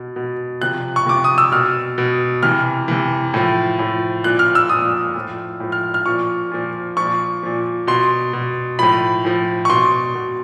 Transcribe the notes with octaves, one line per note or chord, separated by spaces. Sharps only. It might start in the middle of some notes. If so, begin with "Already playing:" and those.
Already playing: B2
B2
C3 F3 F#6
C#6
C3 F3 D6
D#6
E6
B2 F6
B2
C3 E3 F6
C3 E3
A2 F3
A2 F3
A#2 F3 F#6
F6
E6
A#2 F3 D#6
A2 F3
A2 F3
F6
F6
A#2 F3 C#6
A#2 F3
A#2 F3 C#6
A#2 F3
B2 C6
B2
A2 F3 B5
A2 F3
C#6
B2 C6
B2